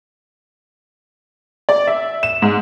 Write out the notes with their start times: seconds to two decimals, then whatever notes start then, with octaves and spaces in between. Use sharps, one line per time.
1.69 D5
1.87 E5
2.23 E7
2.42 G#2